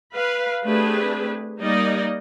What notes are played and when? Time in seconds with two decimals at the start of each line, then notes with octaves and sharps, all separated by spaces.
0.14 B4 F5
0.64 A3 C4 D4 G4 G#4 B4
1.60 G3 A#3 D#4 A#4 D5 D#5